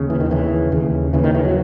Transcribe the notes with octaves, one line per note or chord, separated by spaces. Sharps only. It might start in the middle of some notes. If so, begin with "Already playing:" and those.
Already playing: D#2 C#3
E3
D#3
D#2 C#3 E3
D#2 C#3
D#2 C#3 E3
D#3
E3
F#3